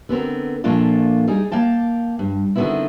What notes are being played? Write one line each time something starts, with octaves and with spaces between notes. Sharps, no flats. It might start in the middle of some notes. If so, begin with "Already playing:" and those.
D3 B3 C4 A#4
A#2 F3 A3 A#3 D4 F4
G3 D#4 G#4
A#3 F5 G5 A5
G2
D3 D#3 F#3 B3 C4 E4